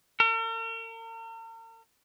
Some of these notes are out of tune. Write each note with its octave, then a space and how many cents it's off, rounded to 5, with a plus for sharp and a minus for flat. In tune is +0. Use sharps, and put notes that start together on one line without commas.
A#4 -45